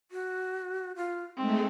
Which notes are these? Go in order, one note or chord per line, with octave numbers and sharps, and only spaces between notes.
F#4
F4
G#3 A3 C4 D#4